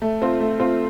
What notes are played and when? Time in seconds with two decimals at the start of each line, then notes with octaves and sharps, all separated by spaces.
0.02 A3
0.21 C4 F4
0.40 A3
0.60 C4 F4